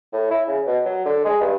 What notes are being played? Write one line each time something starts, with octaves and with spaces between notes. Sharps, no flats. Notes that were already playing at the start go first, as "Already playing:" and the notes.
A2
E4
C#3
B2
F#3
D3
G#3
G2